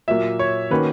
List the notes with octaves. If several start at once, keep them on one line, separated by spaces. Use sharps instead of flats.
A#2 F#3 A#3 E5
C#5
D#3 A#3 C#4 F#4 B4